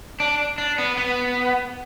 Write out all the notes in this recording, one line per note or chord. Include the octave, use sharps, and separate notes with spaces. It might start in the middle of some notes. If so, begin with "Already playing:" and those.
D4
D4
B3
B3